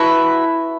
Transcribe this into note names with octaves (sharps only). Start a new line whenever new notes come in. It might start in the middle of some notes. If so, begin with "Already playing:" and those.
Already playing: E4 F#4 B4 E5 A5